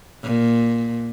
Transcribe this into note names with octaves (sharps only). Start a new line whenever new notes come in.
A#2